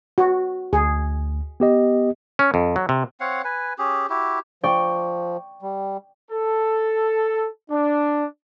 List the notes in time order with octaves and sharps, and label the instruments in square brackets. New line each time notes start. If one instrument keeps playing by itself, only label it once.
[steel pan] F#4
[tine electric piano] D2 [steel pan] G#4
[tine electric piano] B3 G4 D#5
[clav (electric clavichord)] C#4
F2
F#3
C3
[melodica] C4 C#5 F5 F#5
B4 G#5
C#4 G4 G#4
E4 F#4 G4
[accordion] F3 [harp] D5 G5 C#6
[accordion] G3
[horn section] A4
D4